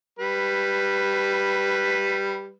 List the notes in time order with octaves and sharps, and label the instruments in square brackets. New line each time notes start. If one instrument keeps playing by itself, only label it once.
[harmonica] G3 B4